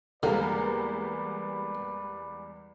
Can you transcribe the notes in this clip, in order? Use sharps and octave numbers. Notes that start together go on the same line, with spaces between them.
E2 D3 G3 G#3 A#3 B4 D5